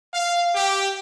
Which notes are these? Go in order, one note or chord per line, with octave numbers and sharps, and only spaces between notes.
F5
G4